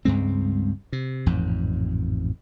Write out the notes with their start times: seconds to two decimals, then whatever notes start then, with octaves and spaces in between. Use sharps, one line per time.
0.05 C#2 G2 G#3 C4
0.92 C3
1.26 A1 F2 G#2